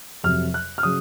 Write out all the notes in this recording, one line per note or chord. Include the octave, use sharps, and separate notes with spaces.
F2 C3 F#3 F6
F#6
F6
C#3 F#3 D#6